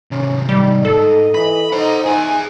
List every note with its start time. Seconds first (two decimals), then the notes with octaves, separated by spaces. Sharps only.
0.11 C2 G#2 C#4
0.49 G3 D#4
0.85 G#2 A4 D#5
1.35 E3 B5
1.73 D#4 C5 D#5 F#5 C6
2.06 D#4 G#4 E5 G#5